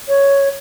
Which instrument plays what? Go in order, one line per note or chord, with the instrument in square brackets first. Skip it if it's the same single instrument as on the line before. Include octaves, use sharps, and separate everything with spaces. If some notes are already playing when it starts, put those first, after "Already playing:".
[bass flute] C#5